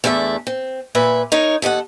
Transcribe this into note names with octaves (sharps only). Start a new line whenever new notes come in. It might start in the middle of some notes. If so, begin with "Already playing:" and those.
E2 A3 D4 G4 E5
C4
A#2 B4 E5
D#4 A#4 C#5 D#5
D#2 A4 D#5 F#5